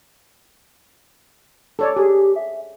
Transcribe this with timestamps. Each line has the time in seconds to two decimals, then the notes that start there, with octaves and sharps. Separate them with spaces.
1.79 A4 C#5 D5
1.96 G4 G#4
2.36 E5